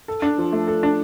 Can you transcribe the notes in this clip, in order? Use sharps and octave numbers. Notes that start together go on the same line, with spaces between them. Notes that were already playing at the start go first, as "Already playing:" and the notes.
A4
D4
F3
A3
A4
D4